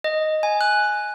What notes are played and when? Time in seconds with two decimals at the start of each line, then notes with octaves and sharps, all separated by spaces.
0.04 D#5
0.43 G#5
0.61 F#6